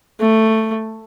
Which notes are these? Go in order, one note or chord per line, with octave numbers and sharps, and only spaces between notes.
A3